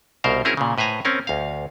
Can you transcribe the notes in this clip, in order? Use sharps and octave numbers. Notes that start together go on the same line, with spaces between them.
C2 B2 A#4 C5 F5
C4 C#4 E4 F#4 G#4 A#4
A#2 C#3
A2 B4 C5 G#5 A#5
C4 C#4 A#4
D2 F5